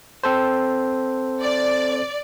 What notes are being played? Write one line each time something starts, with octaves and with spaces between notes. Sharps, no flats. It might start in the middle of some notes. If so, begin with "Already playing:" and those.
C4 A4 C5
D5